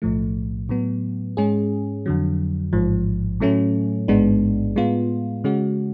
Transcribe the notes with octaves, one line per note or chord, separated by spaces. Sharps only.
B1 A2 F3 A3
A2 F#3 B3
G#2 G#3 C#4 G#4
F2 D3 F#3
A1 G#2 F3
A2 F#3 A3 C#4
A1 G#2 G#3 B3 D4
A2 G#3 B3 F4
C#3 G#3 C#4 F#4